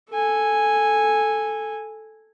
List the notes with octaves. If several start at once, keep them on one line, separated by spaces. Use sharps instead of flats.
A4 G#5